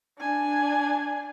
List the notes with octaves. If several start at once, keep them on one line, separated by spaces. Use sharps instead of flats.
D4 G#5